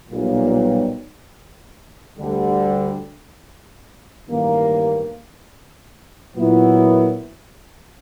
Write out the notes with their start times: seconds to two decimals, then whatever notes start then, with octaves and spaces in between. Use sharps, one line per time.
0.11 B1 A#2 G3
2.19 D2 D3 G3
4.27 A1 G2 D#3 G3 A#3
6.36 A#2 F#3 B3 E4